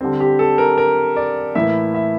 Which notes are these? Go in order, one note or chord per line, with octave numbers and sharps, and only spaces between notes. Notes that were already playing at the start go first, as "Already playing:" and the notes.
D3 G3 C4
G4
A4
A#4
A#4
D5
A2 E3 A#3 E4 E5
E5